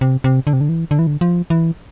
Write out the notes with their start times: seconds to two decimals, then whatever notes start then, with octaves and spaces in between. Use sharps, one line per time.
0.01 C3
0.24 C3
0.47 D3
0.53 C3
0.61 D3
0.69 E3
0.91 D3
0.99 E3
1.07 D3
1.21 F3
1.50 E3